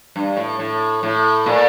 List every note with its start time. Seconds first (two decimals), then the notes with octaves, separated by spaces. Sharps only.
0.16 G2
0.36 A2
0.59 A2
1.03 A2
1.46 A#2